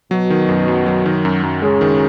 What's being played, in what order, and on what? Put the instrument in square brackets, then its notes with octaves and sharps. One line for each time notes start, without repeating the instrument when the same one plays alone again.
[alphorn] B2 [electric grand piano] F#3
[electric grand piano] D#3
F#2
F#2
F#3
D#3
F#2
F#2
[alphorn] C#3 [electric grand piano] G#3
[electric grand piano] D#3